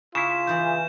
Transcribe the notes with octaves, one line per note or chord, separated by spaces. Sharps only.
C#3 E4 F4 E7
E2 E3 G#4 G6